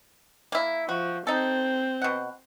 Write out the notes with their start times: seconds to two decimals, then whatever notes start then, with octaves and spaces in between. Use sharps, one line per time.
0.52 A#3 E4
0.89 F3 F#4
1.27 C4 D#4 A4
2.02 B2 F#5